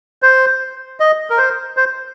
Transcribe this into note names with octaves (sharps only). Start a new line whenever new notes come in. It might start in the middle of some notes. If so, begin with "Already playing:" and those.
C5
D#5
A#4
C5
C5